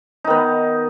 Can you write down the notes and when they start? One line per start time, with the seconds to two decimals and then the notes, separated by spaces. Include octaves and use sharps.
0.24 D#4
0.27 D#3
0.30 B3